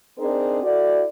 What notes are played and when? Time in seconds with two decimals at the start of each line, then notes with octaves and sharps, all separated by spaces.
0.18 C4 D4 D#4 G#4 A#4 C5
0.62 E4 F#4 A4 D5